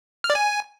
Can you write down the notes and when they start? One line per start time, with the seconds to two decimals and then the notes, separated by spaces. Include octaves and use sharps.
0.24 F6
0.30 D5
0.35 G#5